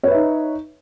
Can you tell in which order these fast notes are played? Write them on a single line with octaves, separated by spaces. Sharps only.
C#5 B4 E5 D#4